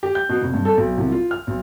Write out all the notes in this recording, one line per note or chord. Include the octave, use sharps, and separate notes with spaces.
G4
G6
B2
F1
G2
A4
B1
C2
F4
F6
B1